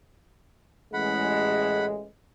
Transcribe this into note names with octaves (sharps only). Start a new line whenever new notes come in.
A1 G#3 F#5 B5